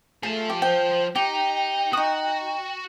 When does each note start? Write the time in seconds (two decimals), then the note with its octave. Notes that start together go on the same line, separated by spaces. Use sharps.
0.23 F3 A3 G#4 A5
0.50 G4
0.62 C5 G5
1.15 D#4 G4 G5
1.93 D#4 F#4 D#6